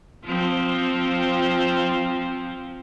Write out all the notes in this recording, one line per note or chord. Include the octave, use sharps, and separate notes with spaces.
F3 C4